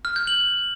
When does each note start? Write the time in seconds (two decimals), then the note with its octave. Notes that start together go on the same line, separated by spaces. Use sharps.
0.05 F6
0.16 G6
0.27 F#7